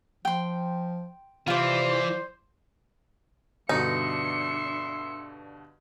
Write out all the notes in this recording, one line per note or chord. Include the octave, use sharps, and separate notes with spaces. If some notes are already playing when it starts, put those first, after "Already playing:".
F3 G5 C6
C3 E3 F4 C5 D5
G2 B2 D3 D4 D#4 E5 C6 C#7